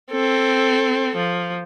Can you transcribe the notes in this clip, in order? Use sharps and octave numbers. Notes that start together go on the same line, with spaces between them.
C4 A4
F3